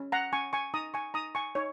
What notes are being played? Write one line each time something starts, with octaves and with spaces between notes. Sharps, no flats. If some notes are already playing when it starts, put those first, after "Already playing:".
Already playing: C#4
F#5 A#5
C#4 G#5 C#6
G#5 C#6
D#4 A#5 D#6
G#5 C#6
D#4 A#5 D#6
G#5 C#6
D#4 C#5